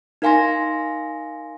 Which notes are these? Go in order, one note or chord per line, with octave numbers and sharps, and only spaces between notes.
D#4 A#4 F5 G#5 C6 A#6